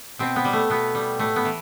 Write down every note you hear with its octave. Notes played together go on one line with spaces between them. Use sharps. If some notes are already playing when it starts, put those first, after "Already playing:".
B2 C4
B3
G3
A3
B2 B3
G3
A2 A3
B3
E3